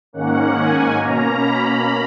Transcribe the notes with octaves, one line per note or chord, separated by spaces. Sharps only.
G#2 D#3 A#3 C#4 F#5
G#5
B2 A#3 C#4 A#5
B5